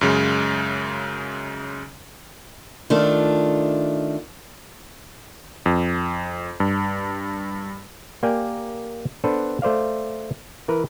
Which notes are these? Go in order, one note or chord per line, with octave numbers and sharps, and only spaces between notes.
F#2 C#3 G#3
D#3 A3 D4 F4
F2
G2
A#3 G4 A#4 D5 G5 G#5
B3 D4 A4 B4 C5
A3 C5 D5 F5
E3 A#4 B4